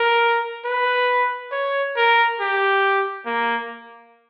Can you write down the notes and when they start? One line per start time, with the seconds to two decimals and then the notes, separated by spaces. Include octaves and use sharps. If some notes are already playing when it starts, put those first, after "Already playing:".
Already playing: A#4
0.65 B4
1.52 C#5
1.97 A#4
2.40 G4
3.26 A#3